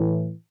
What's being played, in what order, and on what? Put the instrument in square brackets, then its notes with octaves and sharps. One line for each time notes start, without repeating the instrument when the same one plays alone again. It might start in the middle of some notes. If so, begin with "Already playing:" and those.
Already playing: [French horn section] A2 E3